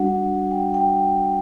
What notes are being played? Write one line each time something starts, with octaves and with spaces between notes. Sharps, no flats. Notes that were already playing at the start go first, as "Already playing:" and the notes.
Already playing: G3 D4 F#4 F#5
G5
G5